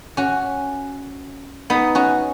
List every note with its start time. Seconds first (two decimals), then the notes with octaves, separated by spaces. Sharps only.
0.17 C#4 F#4
1.70 B3 D#4
1.95 C#4 F#4